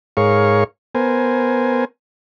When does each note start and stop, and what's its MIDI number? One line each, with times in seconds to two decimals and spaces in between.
0.17 0.64 44
0.17 0.64 68
0.17 0.64 70
0.17 0.64 73
0.17 0.64 77
0.17 0.64 85
0.95 1.85 59
0.95 1.85 70
0.95 1.85 72
0.95 1.85 80